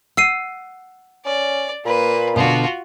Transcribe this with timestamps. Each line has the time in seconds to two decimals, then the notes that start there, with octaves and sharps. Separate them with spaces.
0.17 F#5 E6 C7 D#7
1.26 C#4 D5
1.85 A#2 A#3 B4
2.36 B2 D3 F4 F#4